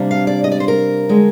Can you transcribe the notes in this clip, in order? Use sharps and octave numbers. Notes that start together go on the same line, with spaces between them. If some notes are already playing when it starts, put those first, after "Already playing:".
Already playing: C3 G3 A#3 D4
F5
D5
D#5
D5
C5
A#4
D3 G#3